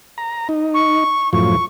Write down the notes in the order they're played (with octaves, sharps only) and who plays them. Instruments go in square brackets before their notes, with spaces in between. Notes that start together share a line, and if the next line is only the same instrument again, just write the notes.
[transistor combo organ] A#5
D#4
[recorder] C#6
[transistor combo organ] F#2 A2 F3 [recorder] C#6